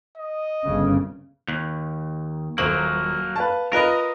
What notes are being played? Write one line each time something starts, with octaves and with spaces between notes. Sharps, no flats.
D#5
G1 C#3
D#2
D#1 F#3 A#3 C5 F#7
B4 F5 A5
F4 A#4 B4 D#5